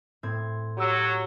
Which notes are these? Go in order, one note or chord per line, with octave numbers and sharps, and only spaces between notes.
A2 C4 G#6
F#3 G4 E6